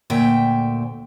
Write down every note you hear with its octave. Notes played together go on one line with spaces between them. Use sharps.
D2 A#2 E5 G5